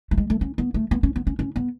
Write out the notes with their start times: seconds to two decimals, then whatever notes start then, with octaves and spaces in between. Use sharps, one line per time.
0.11 A3
0.18 G#3
0.30 A3
0.41 C#4
0.58 B3
0.74 A3
0.91 B3
1.03 C#4
1.16 B3
1.27 C#4
1.39 C#4
1.56 B3